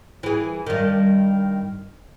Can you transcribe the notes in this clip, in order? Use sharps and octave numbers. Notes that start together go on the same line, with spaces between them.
E3 G#4
G2 D#3